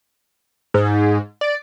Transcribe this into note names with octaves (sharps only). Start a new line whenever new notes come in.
G#2
D5